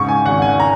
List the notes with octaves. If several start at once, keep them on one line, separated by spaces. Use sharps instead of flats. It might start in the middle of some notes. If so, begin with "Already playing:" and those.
Already playing: G#2 C#3 C#6
G#5
G#1 F#5
G#5
A#5